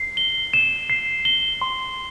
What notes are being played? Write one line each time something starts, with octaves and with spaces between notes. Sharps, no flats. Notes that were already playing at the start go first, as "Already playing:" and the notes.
Already playing: C7
G7
E7
C7
G7
C6